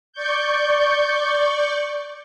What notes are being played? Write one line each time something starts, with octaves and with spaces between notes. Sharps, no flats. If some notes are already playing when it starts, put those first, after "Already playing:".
D5 C#6 G6